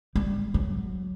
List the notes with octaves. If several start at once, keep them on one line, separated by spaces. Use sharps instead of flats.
G3
F#3